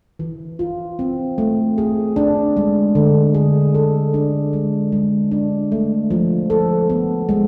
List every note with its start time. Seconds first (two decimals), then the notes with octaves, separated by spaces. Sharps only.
0.19 E3
0.59 F4
0.99 C4
1.38 A3
1.78 G#4
2.16 D4
2.57 G#3
2.95 D3
3.34 G#4
3.74 A4
4.14 D4
4.53 G#3
4.92 G#3
5.31 D4
5.72 A3
6.11 F3
6.50 A4
6.90 B3
7.29 G#3